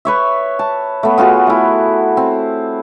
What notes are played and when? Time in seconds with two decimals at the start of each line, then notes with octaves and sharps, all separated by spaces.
0.05 B4 C#5 E5
0.59 A5
1.03 A3 B3
1.18 B3 F4 F#4 G#4
1.47 A3 E4
2.17 C4